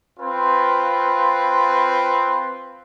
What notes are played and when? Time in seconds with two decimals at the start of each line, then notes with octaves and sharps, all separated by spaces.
0.20 C4 F4 B4 C6